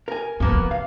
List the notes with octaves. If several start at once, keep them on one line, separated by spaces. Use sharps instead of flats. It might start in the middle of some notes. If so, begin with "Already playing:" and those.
A#4 G#5
G2 F3 A#3 B3
C3
F5